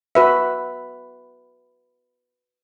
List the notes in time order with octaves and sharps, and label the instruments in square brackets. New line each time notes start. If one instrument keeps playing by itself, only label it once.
[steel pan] F#4 B4 E5